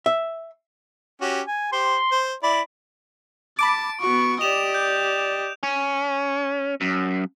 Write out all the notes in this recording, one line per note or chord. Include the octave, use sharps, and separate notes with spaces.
E5
C#4 F#4 G4
G#5
G4 C5 C6
C5
E4 D5 B5
A5 B5 D6 D7
B3 F#4 C#6
G4 D5 D#5 E7 F7
G6
C#4
F#2